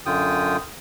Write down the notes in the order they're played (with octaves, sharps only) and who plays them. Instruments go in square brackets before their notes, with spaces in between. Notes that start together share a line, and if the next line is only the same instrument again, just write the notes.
[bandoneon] F#2 D3 F4 G5 D#6